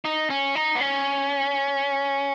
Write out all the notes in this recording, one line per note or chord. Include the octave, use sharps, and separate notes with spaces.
D#4
C#4
D#4
B3
C#4